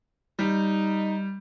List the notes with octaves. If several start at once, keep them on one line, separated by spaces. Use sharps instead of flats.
G3 D#4